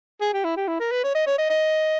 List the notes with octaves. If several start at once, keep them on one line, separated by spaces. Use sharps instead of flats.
G#4
G4
E4
G4
E4
A#4
B4
C#5
D#5
C#5
D#5
D#5